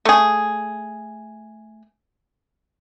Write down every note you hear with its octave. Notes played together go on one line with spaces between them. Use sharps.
A3 G#4